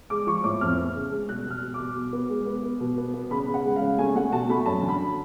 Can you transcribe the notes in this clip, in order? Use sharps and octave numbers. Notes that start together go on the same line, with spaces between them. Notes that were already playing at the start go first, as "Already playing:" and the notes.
G#3 D6
F3 C#6
A2 D6
F2 F6
B3
C#3
G#3
B2 F#6
B2 F6
B2
D6
B2
B2
B3
G#3
B3
B3
B2
B3
B3
C#3 B5
C#3
F#5
G#3
F5
C#3
A3 G#5
A3 F#5
B2 A5
A3 B5
F#2 A5
D3
B5